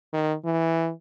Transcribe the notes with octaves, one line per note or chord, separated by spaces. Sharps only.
D#3
E3